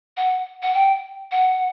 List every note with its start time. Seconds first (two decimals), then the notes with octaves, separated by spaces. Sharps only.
0.17 F#5
0.62 F#5
0.74 G5
1.32 F#5